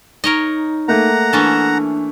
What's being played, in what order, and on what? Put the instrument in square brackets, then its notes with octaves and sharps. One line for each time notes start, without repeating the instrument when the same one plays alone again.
[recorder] D#4 [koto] A#4 C#5 D#5
[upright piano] A3 A#3 [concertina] F#5 A#5
[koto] E3 C#4 A4 [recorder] D4